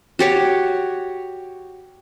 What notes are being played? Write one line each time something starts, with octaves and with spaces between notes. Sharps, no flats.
F#4 G4 C#5